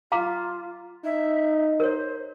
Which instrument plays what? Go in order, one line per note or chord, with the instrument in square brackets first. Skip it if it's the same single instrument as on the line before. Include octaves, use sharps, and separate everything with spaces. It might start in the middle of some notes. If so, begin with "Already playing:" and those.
[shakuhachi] F4 [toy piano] F5 A#5 D6
[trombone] D#4 [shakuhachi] E5
[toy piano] A#4 C#5 [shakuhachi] C5